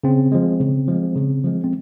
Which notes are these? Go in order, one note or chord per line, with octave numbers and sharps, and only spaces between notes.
C#3 C4
F3 G#3
C#3
F3 G#3
C#3
F3 G#3
C4